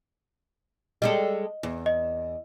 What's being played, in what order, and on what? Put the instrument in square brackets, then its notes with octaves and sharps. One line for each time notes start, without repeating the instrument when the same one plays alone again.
[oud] G3 G#3 A4 [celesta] D#5
[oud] E2
[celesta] D#5